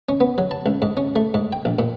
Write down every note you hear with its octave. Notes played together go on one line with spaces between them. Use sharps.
C#4
B3
F#3
A5
C#2
G#2
C#4
A3
G#2
G5
A#1
A#2